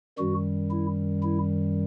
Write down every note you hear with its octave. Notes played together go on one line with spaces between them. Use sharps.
F#2 D#3 G3 F#4
E4
E4